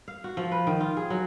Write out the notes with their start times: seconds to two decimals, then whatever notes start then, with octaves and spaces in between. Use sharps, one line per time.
0.08 F5
0.24 F#4
0.37 F3
0.52 B4
0.67 D#3
0.81 F4
0.97 G#4
1.10 F#3